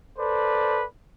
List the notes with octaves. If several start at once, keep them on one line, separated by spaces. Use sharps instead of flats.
A4 B4 C5 D5